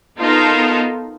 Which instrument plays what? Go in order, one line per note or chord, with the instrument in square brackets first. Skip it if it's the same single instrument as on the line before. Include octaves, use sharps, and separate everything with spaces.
[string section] B3 D#4 F4 A4 A#4